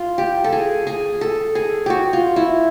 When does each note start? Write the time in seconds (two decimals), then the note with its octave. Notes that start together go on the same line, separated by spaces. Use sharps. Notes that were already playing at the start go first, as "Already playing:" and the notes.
Already playing: F4
0.18 G4
0.44 A4
0.52 G#4
0.87 G#4
1.21 A4
1.55 G#4
1.86 F#4 G4
2.13 F4
2.36 E4